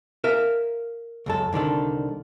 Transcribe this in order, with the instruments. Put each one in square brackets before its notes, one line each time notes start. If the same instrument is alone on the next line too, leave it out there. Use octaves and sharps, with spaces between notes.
[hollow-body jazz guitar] A#4 E5 F5
C#2 F#2 A4
C2 D3 D#3 A4